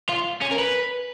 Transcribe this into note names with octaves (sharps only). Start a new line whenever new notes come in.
F4
C#4
A#4
B4